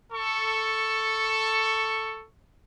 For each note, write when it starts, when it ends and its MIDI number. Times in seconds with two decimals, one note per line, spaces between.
0.13 2.26 69
0.13 2.26 85